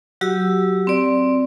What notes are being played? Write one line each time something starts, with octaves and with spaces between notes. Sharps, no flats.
F#3 F#4 G4 E6
C4 D5